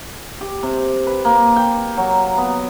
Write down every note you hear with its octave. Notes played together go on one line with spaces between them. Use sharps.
G4
C3
B4
A#3
G5
F#3
B3